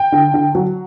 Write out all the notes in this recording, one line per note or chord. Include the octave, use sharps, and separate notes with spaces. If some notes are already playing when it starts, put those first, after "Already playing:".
Already playing: G5
D3
D3
F#3